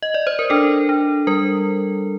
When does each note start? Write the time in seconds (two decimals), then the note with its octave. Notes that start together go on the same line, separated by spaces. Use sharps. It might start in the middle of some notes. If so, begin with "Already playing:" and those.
0.03 D#5
0.14 D5
0.27 C5
0.39 A#4
0.50 D4 A4
0.89 D4
1.27 G3 A#4